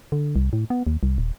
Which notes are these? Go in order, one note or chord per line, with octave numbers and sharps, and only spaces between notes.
D3
C2
A2
B3
D#2
C2
D#1